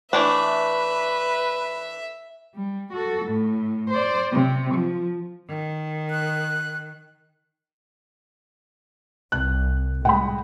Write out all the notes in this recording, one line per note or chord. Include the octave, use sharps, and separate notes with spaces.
E3 A3 D4 B4 E5
G3
F#4 A4
A2
C5 D5
C3
F3
D#3
F#6
C2 F#6
A2 G3 G#3 F#5 G5 B5